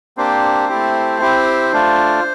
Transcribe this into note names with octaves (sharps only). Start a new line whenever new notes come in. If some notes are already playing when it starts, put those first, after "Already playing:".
A#3 C4 D4 G4 C5
A3 E4 G4
C4 E4 G4
A3 D4 F4